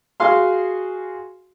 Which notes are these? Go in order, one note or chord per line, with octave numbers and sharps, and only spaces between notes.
F#4 G#4 F5 C6